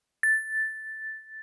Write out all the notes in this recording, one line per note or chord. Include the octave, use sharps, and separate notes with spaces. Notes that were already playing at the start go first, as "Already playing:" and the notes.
A6